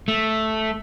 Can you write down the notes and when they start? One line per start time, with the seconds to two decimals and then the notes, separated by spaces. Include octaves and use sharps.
0.08 A3